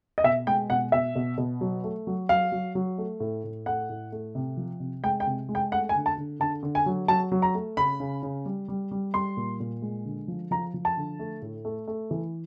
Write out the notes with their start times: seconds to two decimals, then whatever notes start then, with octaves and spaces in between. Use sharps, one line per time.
0.18 D#5
0.24 B2 E5
0.47 G#3 G5
0.70 B2 F#5
0.92 B2 E5
1.15 B2
1.38 B2
1.61 F#3
1.84 A3
2.07 F#3
2.29 F#3 F5
2.52 F#3
2.75 F#3
2.98 A3
3.20 A2
3.44 A2
3.66 A3 F#5
3.89 A2
4.12 A3
4.35 C3
4.57 F3
4.80 C3
5.03 G#3 G5
5.20 G5
5.26 C3
5.49 G#3
5.55 G5
5.72 A3 F#5
5.89 G#5
5.95 D3
6.06 A5
6.18 D3
6.40 D3 A5
6.63 D3
6.75 G#5
6.86 F#3
7.08 F#3 A5
7.32 F#3
7.42 A#5
7.54 A3
7.77 C#3 B5
8.00 C#3
8.23 C#3
8.46 G3
8.68 G3
8.91 G3
9.14 G3 C6
9.37 A#2
9.60 A#2
9.82 G#3
10.05 D3
10.28 F3
10.51 F3 A#5
10.74 F3
10.85 A5
10.97 D3
11.19 A3
11.42 A2
11.65 A3
11.87 A3
12.11 E3